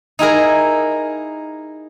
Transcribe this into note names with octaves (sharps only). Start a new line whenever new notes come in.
D#4 E4 G#4 A#4